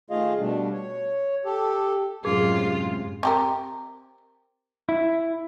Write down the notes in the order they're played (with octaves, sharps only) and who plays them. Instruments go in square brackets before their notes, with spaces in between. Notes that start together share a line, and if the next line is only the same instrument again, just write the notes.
[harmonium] D#3 A3 F4 G#4 D#5 F5
B2 G3 A3 D4
C#5
G4 A4
[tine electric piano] F#2 G#6 [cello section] A2 C3 G#3 [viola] F4 [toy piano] G#4
[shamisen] C4 G4 A#4
[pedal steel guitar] E4